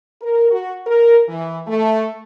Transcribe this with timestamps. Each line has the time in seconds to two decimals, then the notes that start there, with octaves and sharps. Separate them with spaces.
0.22 A#4
0.51 F#4
0.87 A#4
1.28 E3
1.67 A3